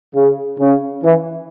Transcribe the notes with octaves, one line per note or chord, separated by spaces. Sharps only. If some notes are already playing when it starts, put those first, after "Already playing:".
C#3
C#3
E3